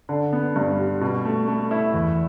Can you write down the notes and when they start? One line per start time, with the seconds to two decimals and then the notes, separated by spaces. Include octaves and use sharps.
0.09 D3
0.33 B3
0.56 G2
0.79 G3
1.01 B2
1.25 A3
1.48 A3
1.71 E4
1.94 E2